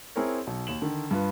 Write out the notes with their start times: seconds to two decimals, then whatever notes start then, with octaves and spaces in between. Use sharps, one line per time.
0.16 C4 E4 G#4 A#4 C#5
0.47 B1
0.67 D#2 E7 F#7
0.82 D3 D#3
1.11 G2 F4 B4